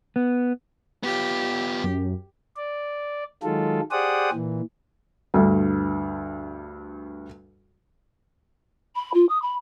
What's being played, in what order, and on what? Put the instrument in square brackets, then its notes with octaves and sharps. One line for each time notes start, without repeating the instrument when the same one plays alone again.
[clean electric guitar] B3
[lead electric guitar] B3 F4 [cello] G4
[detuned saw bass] F#2
[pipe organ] D5
D#3 F#3 G#3 F4 A4
G4 G#4 C5 D5 F#5 D#6
A#2 E3
[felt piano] D2 G2
[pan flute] B5
F4
D#6
B5